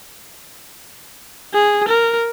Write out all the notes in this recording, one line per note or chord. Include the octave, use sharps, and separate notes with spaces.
G#4
A#4